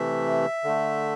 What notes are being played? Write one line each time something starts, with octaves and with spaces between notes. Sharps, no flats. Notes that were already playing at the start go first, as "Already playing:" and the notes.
Already playing: C3 E3 A3 E5
D3 A3